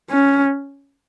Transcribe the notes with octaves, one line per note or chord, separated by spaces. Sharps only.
C#4